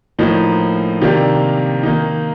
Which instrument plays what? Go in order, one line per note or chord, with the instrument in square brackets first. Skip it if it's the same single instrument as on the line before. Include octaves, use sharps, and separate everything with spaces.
[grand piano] A2 F3 A#3 D#4
C3 D#3 A#3 D4
D#3 A#3 D#4